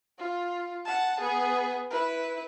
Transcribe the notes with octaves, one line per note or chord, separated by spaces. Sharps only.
F4
F#5 A5
B3 G#4
E4 B4